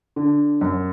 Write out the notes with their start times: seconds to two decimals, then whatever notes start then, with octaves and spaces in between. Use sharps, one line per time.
0.16 D3
0.61 F#2